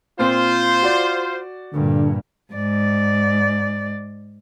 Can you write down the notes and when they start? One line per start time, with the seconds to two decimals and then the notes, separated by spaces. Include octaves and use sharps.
0.19 A#2 C4 F4 C5
0.82 F#4 D5
1.73 G2 A#2 D3
2.53 G#2 D5